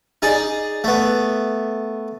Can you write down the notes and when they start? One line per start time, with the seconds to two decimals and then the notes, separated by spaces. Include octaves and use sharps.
0.22 D#4 G#4 D5
0.84 A3 B3